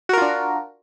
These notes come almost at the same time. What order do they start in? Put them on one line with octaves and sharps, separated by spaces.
F#4 A#4 F4 D4